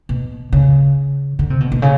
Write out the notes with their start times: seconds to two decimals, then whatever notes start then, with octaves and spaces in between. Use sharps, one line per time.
0.09 B2
0.53 C#3
1.39 D3
1.50 C3
1.60 B2
1.72 B2
1.82 C#3